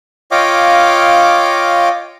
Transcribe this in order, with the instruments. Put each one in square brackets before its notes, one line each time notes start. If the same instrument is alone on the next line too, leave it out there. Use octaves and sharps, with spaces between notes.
[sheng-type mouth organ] F4 C#5 D#5 F5 G5 D6